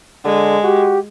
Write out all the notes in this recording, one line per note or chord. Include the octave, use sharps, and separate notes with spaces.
D3 G#3
F#4 G4